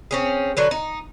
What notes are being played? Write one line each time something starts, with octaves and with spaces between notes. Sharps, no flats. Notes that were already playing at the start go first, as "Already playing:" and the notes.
C4 C#4 G#4
D3 F#3 B4
D#4